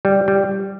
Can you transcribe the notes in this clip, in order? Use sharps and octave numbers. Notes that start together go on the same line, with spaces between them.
G3
G3